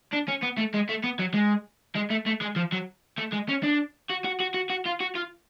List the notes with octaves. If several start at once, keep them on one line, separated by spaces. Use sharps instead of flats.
D4
C#4
B3
A3
G#3
A3
B3
F#3
G#3
G#3
A3
A3
G#3
F3
F#3
A3
G#3
C#4
D4
F#4
F#4
F#4
F#4
F#4
F4
F#4
F4